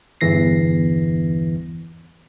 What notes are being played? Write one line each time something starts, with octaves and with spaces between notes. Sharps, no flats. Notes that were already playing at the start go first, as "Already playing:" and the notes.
G1 E2 E3 A#6 C7